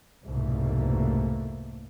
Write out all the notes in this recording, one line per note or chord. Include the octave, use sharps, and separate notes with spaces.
C2 F2 G#2 B2 A3 A#3